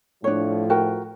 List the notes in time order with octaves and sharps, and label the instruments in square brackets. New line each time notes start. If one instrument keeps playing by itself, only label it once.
[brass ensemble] A2 F3 [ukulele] D4 C#5
[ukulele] F#4 A#4 G5